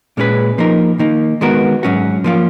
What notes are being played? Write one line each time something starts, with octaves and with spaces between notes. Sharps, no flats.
A#2 G#3 C#4 G#4 B4
F3 A#3 D#4 A#4
D#3 A#3 D#4
D#3 G#3 B3 F#4 A#4
G#2 F#3 C#4 F#4
F3 A#3 C#4 F4